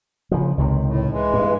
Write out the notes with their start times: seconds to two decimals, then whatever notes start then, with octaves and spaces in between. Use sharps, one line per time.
0.31 C#3 F3
0.58 C#2 C3 D#3
0.85 A2
1.10 E3 G#3
1.34 G2